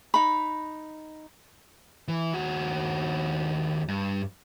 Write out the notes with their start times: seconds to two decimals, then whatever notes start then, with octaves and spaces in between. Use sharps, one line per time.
0.14 D#4 B5
2.08 E3
2.34 D#2 F#4
3.88 G2